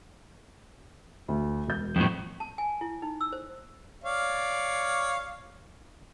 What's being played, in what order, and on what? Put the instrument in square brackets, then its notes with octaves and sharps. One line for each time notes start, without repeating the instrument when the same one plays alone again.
[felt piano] D2
E1 G6
[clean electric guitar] F2 A2
[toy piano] A5
G#5
E4
D#4
E6
C5
[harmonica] C#5 D5 F5